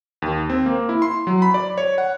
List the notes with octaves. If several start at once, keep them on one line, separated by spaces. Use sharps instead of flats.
D#2
C4
A#3
E4
C6
F#3
B5
D5
C#5
F#5